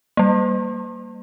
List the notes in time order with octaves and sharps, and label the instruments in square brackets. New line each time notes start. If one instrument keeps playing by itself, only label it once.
[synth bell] G3 A#3